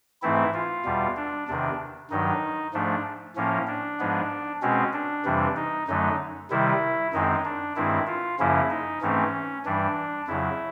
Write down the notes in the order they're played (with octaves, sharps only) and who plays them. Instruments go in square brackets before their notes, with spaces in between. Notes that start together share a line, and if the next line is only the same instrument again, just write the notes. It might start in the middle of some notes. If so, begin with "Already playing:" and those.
[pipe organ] G#2 E3 A3 C4 E4
F4
E2 B2 G3
D4
E2 C3 D#3 D4
G2 D#3 F#3 D#4
G#2 F3 A3 D4
A2 F3 A#3 C#4
D4
G#2 F3 G#3 B3
B2 G#3 C4 C#4
D4
F2 C3 E3 G3
D#4
F#2 D3 F#3 A3 D#4
C3 D#3 G3 E4
F#2 D#3 G#3 C4 D#4
D4
G2 D#3 G#3 C4 E4
F4
F#2 C#3 F3 A#3 C#4 E4
D#4
G#2 E3 A3 C4 C#4
G2 E3 G3 D4
F2 C#3 F#3 E4